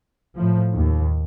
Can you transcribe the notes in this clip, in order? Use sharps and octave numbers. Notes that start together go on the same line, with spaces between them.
A2 F3
D#2